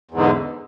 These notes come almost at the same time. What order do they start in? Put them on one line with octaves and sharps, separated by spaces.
E2 G#2 D3